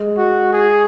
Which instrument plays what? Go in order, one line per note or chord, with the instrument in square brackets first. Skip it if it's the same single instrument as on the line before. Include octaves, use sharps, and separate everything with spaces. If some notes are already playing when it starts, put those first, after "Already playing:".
Already playing: [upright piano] G#3
[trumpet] F#4
G#4